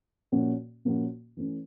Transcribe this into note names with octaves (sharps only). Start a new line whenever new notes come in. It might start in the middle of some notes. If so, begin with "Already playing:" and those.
A#2 F3 A#3 C#4 F#4
A#2 F3 A#3 C#4 F#4
E3 A3 C#4